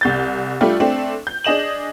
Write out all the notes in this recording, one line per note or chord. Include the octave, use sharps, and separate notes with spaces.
C2 G6 A6
G3 A3 D4 F4 G4
A3 C4 D4
G6
D4 G#4 D#5 E7 F#7